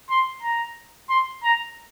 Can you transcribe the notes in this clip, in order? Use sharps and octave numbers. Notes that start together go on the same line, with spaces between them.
C6
A#5
C6
A#5